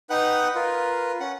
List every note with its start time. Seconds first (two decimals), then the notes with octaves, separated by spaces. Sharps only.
0.10 D#4 B4 F#5 G5 F#6
0.55 F4 A#4 B4
1.20 C#4 F#5